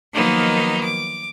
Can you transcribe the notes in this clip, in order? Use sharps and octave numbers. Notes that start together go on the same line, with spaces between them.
D#3 F3 F#3 A#3 B3 D#4
D6